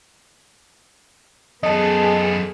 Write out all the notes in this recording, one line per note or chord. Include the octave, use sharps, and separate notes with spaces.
F#2 B3 G#4 A4 D#5 A5